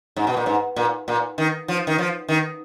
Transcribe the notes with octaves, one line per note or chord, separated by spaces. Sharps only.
G#2
B2
A#2
G#2
A#2
A#2
D#3
F3
D#3
F3
D#3